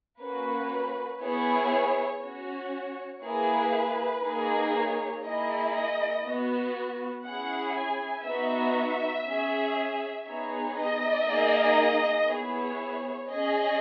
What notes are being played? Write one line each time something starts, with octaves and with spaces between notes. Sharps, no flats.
A#3 C#4 F#4 B4
B3 E4 G#4 C#5
C#4 F#4 C#5
A#3 E4 G#4 B4
A#3 D#4 G#4
C#5
A#3 E4 G#4 D#5
D#5
B3 F#4
C#4 E4 G#4 F#5
G#5
B3 D#4 F#4 E5
C#4 G#4
B3 D#4 G#4 C#5
D#5
A#3 D#4 G#4
B3 E4 G#4 C#5
C#4 G#4 D#5